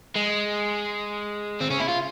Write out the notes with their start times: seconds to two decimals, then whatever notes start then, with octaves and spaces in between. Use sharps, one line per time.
0.16 G#3
1.60 C4
1.70 C#4
1.80 E4
1.88 F4